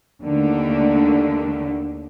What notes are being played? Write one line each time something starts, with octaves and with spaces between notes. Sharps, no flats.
D#2 D3 A3